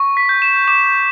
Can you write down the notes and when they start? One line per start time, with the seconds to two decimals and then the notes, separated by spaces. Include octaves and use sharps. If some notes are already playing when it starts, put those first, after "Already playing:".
Already playing: C#6
0.17 B6
0.29 G6
0.42 E7
0.68 D6 E7